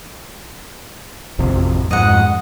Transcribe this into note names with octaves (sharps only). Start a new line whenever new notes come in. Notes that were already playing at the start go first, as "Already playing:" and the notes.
A1 F2 C3
F2 G#2 D#5 F#5